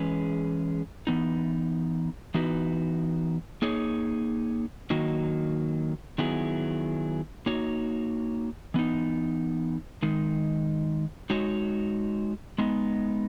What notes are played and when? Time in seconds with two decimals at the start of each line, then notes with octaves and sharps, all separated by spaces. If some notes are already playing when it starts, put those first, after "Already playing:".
Already playing: E3 G#3 C#4 G#4 B4
1.07 E3 B3 D#4
2.34 E3 B3 D#4 F#4 B4
3.62 A#3 D#4 G#4 C#5
4.90 D#3 F#3 A#3 D#4 F#4
6.18 D#3 F#3 B3 E4 G#4
7.46 A#3 D#4 F#4 C#5
8.74 E3 B3 D#4
10.03 D#3 G#3 D#4
11.30 G#3 D#4 F#4 C#5
12.58 G#3 B3 D#4